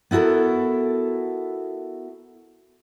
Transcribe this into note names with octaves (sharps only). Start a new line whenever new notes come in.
B3 E4 F#4 A4 A#4